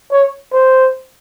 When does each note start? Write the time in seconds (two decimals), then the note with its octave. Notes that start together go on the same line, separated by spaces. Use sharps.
0.11 C#5
0.53 C5